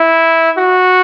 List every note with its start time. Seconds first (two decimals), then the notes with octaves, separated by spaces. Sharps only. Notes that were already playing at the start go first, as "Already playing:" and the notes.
Already playing: E4
0.58 F#4